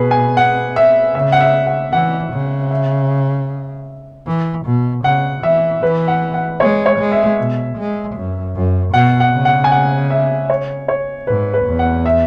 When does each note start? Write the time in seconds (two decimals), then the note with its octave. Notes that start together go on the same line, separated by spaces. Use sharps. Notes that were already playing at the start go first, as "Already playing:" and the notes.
Already playing: B2 G#4 B4
0.11 G#5
0.37 F#5
0.76 E5
1.15 C#3 E5
1.32 F#5
1.41 E5
1.67 F#5
1.93 E3 F#5
2.32 C#3
2.71 E5
4.27 E3
4.65 B2
5.04 C#3 F#5
5.43 E3 E5
5.82 E3 B4
6.08 F#5
6.34 F#5
6.60 G#3 C#5
6.86 C#5
6.99 G#3
7.12 E5
7.38 B2
7.77 G#3
8.15 F#2
8.55 F#2
8.93 B2 F#5
9.20 F#5
9.33 C#3
9.45 F#5
9.64 G#5
9.72 F#5
10.10 E5
10.50 C#5
10.88 C#5
11.27 G#2 B4
11.54 B4
11.66 E2
11.79 F#5
12.06 E5